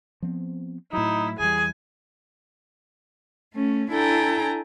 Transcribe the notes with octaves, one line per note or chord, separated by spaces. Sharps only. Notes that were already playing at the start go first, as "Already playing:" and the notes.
F3 B3 C4
A2 F#3 D#4 E4
E2 E3 G3 G#4 G#5
A3 C#4
D4 E4 A4 G5 G#5 A#5